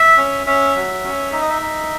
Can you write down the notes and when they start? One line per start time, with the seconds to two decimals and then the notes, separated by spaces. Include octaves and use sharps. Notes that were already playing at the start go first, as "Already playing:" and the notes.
Already playing: E5
0.17 C#4
0.47 C#4 E5
0.76 F#3
1.04 C#4
1.32 D#4 E5
1.42 D#5
1.50 E5
1.62 D#4